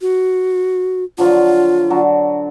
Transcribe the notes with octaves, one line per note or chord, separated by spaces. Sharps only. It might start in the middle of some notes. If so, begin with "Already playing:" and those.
F#4
D3 F3 F#3 F4
D3 F#3 A5